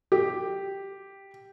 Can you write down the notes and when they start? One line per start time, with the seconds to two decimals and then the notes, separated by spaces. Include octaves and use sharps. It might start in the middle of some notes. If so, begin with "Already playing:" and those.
0.12 G4